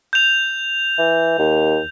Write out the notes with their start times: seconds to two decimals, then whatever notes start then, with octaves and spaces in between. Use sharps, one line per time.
0.13 G6 F7
0.98 E3
1.38 D#2